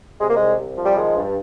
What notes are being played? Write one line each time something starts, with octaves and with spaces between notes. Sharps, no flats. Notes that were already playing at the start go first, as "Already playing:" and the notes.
C3 G#3
A#3
C2 G#3
C2
F3
G3
D#3 G#3
G2